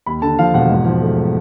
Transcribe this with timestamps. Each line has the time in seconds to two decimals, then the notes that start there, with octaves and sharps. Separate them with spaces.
0.06 D#2 B5
0.22 D3 A5
0.39 F3 F5
0.54 E1 F#5
0.70 G#2
0.85 F3
1.02 A3